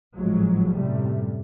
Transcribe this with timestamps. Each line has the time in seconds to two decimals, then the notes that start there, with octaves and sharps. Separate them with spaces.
0.16 G#1 A2 F3 F#3 G#3
0.70 F#2 A2 C3 G3 A3